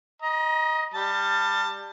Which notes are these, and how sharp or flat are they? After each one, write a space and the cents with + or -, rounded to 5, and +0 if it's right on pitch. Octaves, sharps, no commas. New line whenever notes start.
D#5 +5 A#5 +35
G3 +15 A5 +25